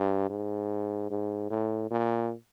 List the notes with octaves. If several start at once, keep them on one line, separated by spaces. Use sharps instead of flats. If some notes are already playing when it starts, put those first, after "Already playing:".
Already playing: G2
G#2
G#2
A2
A#2